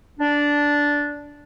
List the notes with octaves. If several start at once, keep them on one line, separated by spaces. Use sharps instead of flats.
D4